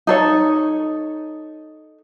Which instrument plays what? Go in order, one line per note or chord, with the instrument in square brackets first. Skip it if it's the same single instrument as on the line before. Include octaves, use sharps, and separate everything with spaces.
[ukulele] D#4 A4 C#5